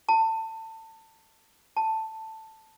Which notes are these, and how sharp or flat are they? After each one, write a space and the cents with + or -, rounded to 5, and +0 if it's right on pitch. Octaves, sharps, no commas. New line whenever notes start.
A5 +25
A5 +5